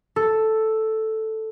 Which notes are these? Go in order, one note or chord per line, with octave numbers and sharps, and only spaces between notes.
A4